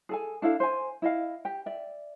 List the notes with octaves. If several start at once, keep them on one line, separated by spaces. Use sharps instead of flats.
G#4 A4 G#5
D4 E4 A4 F5
C5 G#5
E4 D#5 F5
G4 G5
D5 E5